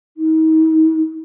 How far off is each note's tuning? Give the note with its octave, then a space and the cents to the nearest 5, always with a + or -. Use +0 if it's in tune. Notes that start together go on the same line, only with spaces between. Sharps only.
D#4 +40